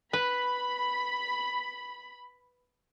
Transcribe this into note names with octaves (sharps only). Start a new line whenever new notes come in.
B4 B5